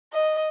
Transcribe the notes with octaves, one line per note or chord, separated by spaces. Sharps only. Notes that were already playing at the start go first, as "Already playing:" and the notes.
D#5